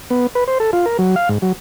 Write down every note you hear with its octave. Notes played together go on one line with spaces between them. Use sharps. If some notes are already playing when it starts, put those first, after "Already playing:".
B3
B4
C5
A4
F4
A#4
F#3
F5
G#2
F#3